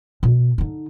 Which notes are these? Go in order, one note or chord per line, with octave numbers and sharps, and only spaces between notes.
B2
D3 D#4